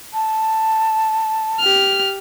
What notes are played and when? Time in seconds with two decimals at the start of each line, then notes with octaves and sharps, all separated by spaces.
0.13 A5
1.60 G4 F6